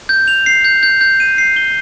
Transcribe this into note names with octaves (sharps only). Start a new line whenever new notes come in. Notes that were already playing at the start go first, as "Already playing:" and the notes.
G6
F7
C7
G6
G6
G6
D#7
C7
G7